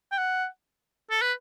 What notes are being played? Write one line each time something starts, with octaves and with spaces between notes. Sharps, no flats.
G5
F#5
A4
B4